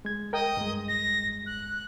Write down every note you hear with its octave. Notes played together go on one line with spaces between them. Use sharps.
G#3 G#6
A#4 D#5 G5
G2 G#3
A#6
F#6